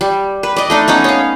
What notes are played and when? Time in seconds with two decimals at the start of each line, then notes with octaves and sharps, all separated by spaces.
0.01 G3
0.43 B4
0.56 D5 D#5
0.70 A3 D4 D#4
0.88 B3 C#4 D#4 C#5
1.04 C#4 F5